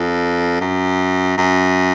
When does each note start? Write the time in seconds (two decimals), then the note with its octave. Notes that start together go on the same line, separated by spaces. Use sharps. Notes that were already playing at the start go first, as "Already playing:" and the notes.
Already playing: F2
0.61 F#2
1.37 F#2